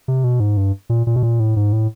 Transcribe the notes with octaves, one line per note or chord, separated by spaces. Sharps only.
C3
B2
G#2
G2
A#2
A#2
B2
A#2
A2
G#2
A2